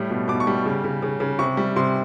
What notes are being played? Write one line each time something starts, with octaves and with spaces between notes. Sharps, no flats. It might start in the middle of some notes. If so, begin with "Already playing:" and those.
Already playing: A2 G3
B2
B2 D6
C#6
G3
C#3
C#3
C#3
C#3
C3 C#6
G3
C3 C6